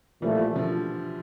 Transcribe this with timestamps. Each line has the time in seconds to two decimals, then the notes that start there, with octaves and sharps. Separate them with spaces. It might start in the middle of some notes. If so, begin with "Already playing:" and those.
0.21 A#2 E3 F3 G3 A3
0.56 D3 F3